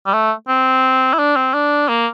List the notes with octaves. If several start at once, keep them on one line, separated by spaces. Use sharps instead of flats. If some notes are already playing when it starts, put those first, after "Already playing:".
G3
A3
C4
E4
D4
C4
D4
A#3